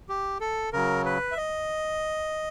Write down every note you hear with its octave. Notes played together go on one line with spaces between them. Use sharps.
G4
A4
C#3 F#3 A#4
B4
E5
D#5